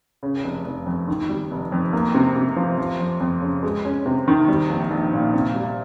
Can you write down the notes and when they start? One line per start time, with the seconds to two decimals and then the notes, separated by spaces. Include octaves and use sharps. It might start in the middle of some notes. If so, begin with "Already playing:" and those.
0.23 C#3
0.44 F1
0.65 F1
0.86 F2
1.08 D#3
1.29 G3
1.51 F1
1.72 F2
1.93 A#3
2.14 C3
2.36 C3
2.56 F3
2.78 F3
3.00 F2
3.20 F2
3.42 C#3
3.63 G#3
3.85 C#4
4.06 C3
4.28 D#3
4.48 G3
4.70 A#1
4.91 A#1
5.13 A#2
5.33 C3
5.55 G3